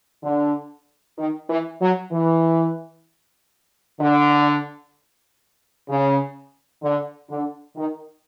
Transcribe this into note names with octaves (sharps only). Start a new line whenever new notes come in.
D3
D#3
E3
F#3
E3
D3
C#3
D3
D3
D#3